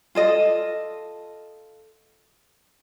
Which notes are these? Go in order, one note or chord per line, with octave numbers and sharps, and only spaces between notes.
F4 A4 D#5